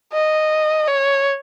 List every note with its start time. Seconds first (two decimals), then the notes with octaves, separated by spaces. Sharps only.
0.13 D#5
0.87 C#5